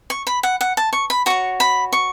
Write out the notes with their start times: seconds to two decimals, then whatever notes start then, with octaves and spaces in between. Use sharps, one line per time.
0.10 C#6
0.27 B5
0.43 F#5
0.61 F#5
0.77 A5
0.93 C#6
1.10 B5
1.26 F#4 C#5 C#6
1.60 B5
1.93 C#6